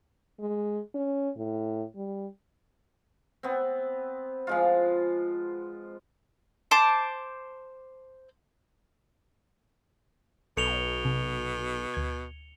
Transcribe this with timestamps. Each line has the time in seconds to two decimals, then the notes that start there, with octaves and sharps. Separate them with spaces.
0.39 G#3
0.95 C#4
1.36 A2
1.95 G3
3.43 B3 C4
4.47 F3 G#3 F4
6.71 C5 A5 D6
10.57 B1 B2 A4 C#7 F7 G7
11.05 C3
11.94 D2 G#6